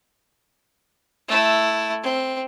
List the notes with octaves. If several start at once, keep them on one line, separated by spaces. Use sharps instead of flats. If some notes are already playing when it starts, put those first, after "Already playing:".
A3 E4
C4